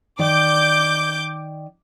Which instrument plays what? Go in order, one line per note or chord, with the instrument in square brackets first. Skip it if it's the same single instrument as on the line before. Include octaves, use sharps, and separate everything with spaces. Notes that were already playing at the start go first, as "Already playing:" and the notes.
[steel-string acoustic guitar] D#3 D5 [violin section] D6 G6